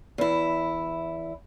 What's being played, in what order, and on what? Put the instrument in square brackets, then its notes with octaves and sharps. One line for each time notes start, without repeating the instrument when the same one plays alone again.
[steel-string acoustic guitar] E2 E4